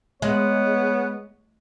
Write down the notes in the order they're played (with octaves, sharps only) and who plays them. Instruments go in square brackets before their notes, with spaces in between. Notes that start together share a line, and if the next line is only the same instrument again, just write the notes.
[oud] G#3 [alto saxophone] B3 [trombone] C#5